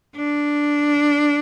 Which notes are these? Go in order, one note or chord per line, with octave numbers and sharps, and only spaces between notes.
D4